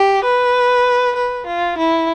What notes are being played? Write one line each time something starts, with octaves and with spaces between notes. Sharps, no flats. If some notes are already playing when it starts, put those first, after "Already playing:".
Already playing: G4
B4
B4
F4
E4